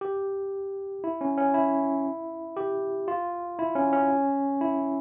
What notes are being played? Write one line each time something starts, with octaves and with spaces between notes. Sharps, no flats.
G4
E4
C#4
C#4
E4
G4
F4
E4
C#4
C#4
E4